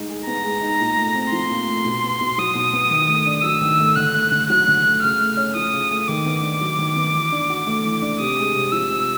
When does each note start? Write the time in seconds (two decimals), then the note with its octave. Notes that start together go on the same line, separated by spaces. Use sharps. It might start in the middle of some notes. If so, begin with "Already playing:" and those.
Already playing: G#3 D#4
0.09 G#4
0.27 B3 A#5
0.44 G#3
0.62 D#4
0.80 A#2
0.97 A3
1.14 C4
1.32 F3 C6
1.50 A#2
1.68 A3
1.85 B2
2.03 B3
2.21 B2
2.38 F#3 D#6
2.55 B2
2.73 B3
2.91 D#3
3.08 A3
3.26 D4
3.43 F#3 E6
3.61 D#3
3.79 A3
3.96 D3 F#6
4.14 A3
4.32 D3
4.49 F#3 F#6
4.68 D3
4.85 A3
5.02 C#3 F6
5.21 A3
5.37 C#4
5.55 F3 D#6
5.73 C#3
5.91 A3
6.08 D#3 D6
6.26 B3
6.43 D4
6.61 F#3
6.78 D#3
6.96 B3
7.15 E3
7.32 D4
7.50 F#4
7.67 A3
7.85 E3
8.02 D4
8.20 C3 D#6
8.38 G#3
8.55 C3
8.72 F3 E6
8.90 C3